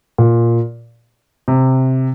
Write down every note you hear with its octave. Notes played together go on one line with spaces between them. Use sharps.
A#2
C3